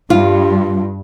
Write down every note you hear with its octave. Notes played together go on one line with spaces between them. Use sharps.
G2 F4